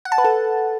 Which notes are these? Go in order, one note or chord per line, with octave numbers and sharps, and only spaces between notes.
F#5
A5
B4
A4